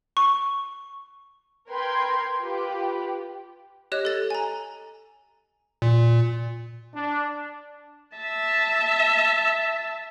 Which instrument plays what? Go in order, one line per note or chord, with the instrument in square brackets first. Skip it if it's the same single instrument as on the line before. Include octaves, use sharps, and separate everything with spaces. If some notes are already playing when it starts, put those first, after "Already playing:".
[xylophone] C#6
[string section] A#4 B4 G5 C6 G#6
F4 G4 B4
[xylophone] G4 C#5 D#5 F#6 E7
A4 A6
G#5 A#5
[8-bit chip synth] A#2
[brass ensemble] D4
[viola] E5 A5